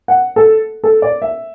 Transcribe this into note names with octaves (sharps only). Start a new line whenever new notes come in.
F#5
A4
A4
D5
E5